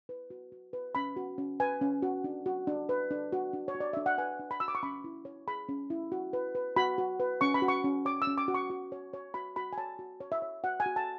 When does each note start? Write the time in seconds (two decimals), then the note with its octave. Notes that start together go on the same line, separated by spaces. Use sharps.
0.09 B4
0.30 F#4
0.52 F#4
0.73 B4
0.95 C#4 B5
1.17 F#4
1.38 C#4
1.60 B4 G#5
1.81 C#4
2.02 F#4
2.24 D4
2.46 F#4
2.67 D4
2.89 B4
3.11 D4
3.33 F#4
3.53 D4
3.68 C#5
3.75 F#4
3.80 D5
3.93 D4 E5
4.06 F#5
4.18 B4 G#5
4.39 D4
4.51 B5
4.60 F#4 E6
4.68 D6
4.75 C#6
4.83 C#4 B5
5.04 E4
5.25 C#5
5.47 G#4 B5
5.69 C#4
5.90 E4
6.12 F#4
6.33 B4
6.55 B4
6.76 F#4 B5
6.98 F#4
7.20 B4
7.41 C#4 C#6
7.54 B5
7.62 F#4
7.68 C#6
7.84 C#4
8.05 C#5 D6
8.22 E6
8.27 C#4
8.38 D6
8.48 F#4
8.54 C#6
8.70 F#4
8.92 C#5
9.13 C#5
9.34 F#4 B5
9.56 F#4 B5
9.73 G#5
9.78 C#5 A5
9.99 F#4
10.20 C#5
10.32 E5
10.42 C#5
10.64 F#4 F#5
10.80 G#5
10.86 F#4
10.96 A5